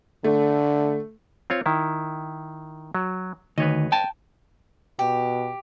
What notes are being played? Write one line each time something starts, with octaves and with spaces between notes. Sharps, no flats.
D3 A3
C4 F4 C#5
D#3 E4
F#3
D2 D#3 B4 C#5 D#5
G5 A5
B2 G4